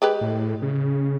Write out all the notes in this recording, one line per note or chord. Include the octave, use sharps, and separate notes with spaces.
G#3 G4 B4
A2
C#3